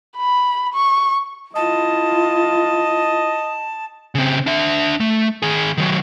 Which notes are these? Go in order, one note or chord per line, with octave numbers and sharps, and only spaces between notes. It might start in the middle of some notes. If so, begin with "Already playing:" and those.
B5
C#6
E4 F4 D#5 A5
C#3 C4
D4 E5
A3
D#3 G#4
D#3 F#3